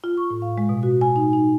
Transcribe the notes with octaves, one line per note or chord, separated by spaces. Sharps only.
F4
C#6
A2
F5
G#3
B2
F#4
G#5
D#4
D#4